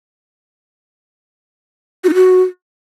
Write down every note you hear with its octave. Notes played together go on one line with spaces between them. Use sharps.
F#4
D#4
F#4